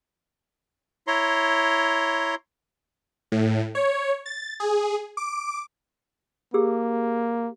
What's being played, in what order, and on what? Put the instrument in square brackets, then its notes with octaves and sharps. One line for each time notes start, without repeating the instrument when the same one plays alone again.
[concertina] E4 C#5 A#5 C6
[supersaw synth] A2
C#5
A6
G#4
D6
[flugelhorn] A#3 [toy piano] G4 G#4 E6